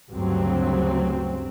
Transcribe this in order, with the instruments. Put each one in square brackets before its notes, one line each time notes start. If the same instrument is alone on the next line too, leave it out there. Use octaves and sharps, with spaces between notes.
[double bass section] D2 G2 C#3 F#3 C4